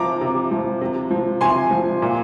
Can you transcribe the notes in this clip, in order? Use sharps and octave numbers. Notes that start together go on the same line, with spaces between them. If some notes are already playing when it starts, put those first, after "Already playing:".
Already playing: C3 F3 A#5 D6
C3
F3
C3
F3
C3 G#5 C6
F3
A#2